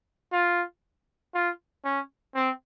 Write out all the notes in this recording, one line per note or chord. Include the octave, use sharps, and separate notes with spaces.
F4
F4
C#4
C4